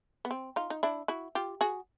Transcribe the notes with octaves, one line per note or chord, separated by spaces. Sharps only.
B3
C4
D#4 F4
D#4
D4 E4
E4 F#4
F4 G4
F#4 G#4